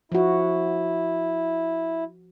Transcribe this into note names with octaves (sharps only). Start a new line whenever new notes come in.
F3 E4 F#4